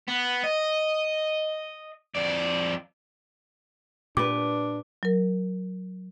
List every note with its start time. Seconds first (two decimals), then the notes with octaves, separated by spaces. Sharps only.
0.08 B3
0.44 D#5
2.15 F2 D5
4.17 A#2 D4 G4 B4 D6
5.03 F#3 A#4